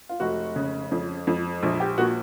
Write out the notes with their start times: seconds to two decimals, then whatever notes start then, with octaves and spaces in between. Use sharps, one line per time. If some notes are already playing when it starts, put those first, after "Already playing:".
0.09 F4
0.20 F1 F#4
0.56 C#3
0.91 F2
1.27 F2
1.63 A#1
1.80 G4
1.98 A#2 F#4